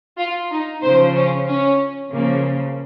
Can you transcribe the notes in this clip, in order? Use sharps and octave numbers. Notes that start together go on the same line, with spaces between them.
F4
D#4
C#3 F3 C5
C#4
C#4
C#3 F3 A#3